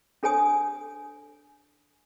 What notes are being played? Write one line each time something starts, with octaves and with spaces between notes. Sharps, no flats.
D4 A4 C#5 G#5 D#6